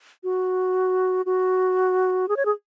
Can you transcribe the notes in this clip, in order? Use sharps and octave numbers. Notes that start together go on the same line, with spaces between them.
F#4
F#4
G#4
C#5
G#4